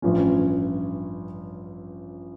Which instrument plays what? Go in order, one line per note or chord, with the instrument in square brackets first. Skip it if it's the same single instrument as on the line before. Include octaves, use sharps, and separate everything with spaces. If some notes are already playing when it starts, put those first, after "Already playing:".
[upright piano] A1 G2 F3 C#4